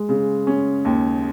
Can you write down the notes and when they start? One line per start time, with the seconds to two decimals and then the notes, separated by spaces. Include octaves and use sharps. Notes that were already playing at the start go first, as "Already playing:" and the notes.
Already playing: G#3
0.09 C#3
0.47 C#4
0.85 D#2